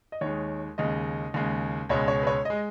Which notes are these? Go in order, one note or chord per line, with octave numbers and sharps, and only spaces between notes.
D#5
D#2 D#3 G#3 C#5
D#2 C#3 G#3 D#5
D#2 C#3 G#3
C#2 B2 G#3 C#5
C#5
B4
C#5
G#3 D#5